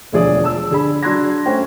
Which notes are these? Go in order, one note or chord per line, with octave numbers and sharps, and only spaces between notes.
E1 D2 F3 G#4 D5 D#6
A5 E6
D3 G#4 B5
F#3 D4 C6 F#6 G#6 A#6
A3 C#4 C5 G5